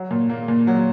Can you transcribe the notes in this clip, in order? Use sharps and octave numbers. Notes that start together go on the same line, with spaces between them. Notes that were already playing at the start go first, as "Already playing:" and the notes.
Already playing: F#3
A#2
A#3
A#2
F#3